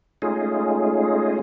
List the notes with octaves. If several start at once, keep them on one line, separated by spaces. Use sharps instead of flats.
G#3 A3 C#4 D#4 F4 G#4